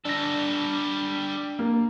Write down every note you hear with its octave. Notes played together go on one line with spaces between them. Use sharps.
G3 D4 A4 A#6
A#3